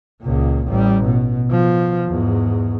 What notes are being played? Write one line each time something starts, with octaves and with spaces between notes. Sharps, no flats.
C#2 A#2
A1 G3
B2
B2 F3
E2 G#2